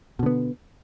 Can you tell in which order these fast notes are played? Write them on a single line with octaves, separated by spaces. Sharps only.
B2 D3 B3